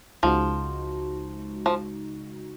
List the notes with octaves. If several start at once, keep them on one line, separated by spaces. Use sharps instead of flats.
C#2 C#3 F3 G#3 D#4 F#4
F3